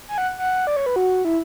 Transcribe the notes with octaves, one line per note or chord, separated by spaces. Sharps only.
G#5
F#5
F#5
D5
C#5
B4
F#4
E4